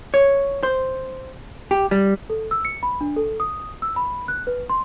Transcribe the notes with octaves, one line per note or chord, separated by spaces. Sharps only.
C#5
C5
G4
G3
A4
E6
C#7
B5
D4
A4
D#6
E6
B5
F#6
B4
C6